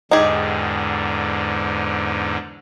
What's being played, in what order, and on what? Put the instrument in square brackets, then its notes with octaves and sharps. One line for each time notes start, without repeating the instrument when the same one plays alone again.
[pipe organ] E2 G#2 D3 [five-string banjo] D#4 G4 G#4